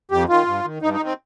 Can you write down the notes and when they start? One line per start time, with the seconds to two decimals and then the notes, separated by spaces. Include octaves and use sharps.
0.11 F2 G4
0.29 D#3 F4
0.46 G2
0.64 D#3
0.82 G2 D#4
0.93 D#4
0.99 D#3
1.05 C4